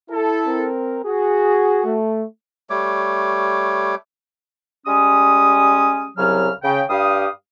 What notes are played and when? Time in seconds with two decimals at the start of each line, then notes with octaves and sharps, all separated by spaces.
0.10 E4 A4
0.46 C4 A#4
1.05 F#4 G#4
1.84 A3
2.70 G3 A3 C#5 D6
4.86 G3 G#3 C#4 D#6
6.18 C2 C#3 F#3 F6
6.64 C#3 G5
6.90 G2 G3 G4 F5 D#6